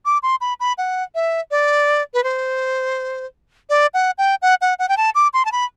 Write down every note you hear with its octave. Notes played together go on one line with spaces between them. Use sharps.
D6
C6
B5
B5
F#5
E5
D5
B4
C5
D5
F#5
G5
F#5
F#5
F#5
G5
A5
D6
C6
A5
B5